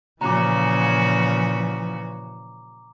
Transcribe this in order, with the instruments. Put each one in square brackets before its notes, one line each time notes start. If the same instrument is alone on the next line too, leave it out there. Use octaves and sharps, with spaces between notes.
[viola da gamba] A#2 C#3 F#4 [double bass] E3 F3 [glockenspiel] A#5 D6